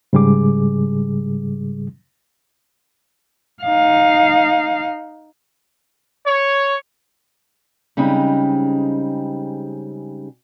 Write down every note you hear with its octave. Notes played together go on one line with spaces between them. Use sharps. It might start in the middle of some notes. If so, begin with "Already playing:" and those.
G#2 C#3 G3 G#4 D6
D#4 F5
C#5
C#3 G3 G#3 C4 C#4 D#4